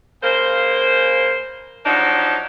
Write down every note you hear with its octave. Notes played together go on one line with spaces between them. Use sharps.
C#3 A#3 C5
F3 F#3 D4 D#4